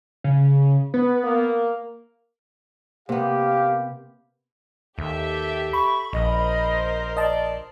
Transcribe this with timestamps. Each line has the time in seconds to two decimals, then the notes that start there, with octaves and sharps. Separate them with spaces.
0.24 C#3
0.94 B3 B4
1.24 A#3
3.09 C3 A#3 B3 G4 F5
4.98 D#2 G4 A4 E5
5.73 B5 C#6
6.13 A#1 A#4 C5 D#5 C6
7.17 D5 D#5 A5